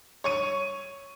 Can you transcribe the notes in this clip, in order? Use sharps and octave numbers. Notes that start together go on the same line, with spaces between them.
C#5 C#6 D#7